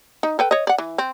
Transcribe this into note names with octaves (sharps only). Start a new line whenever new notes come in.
D#4
A4 B4 G5
C#5 D#5
D5 F#5
E3
C4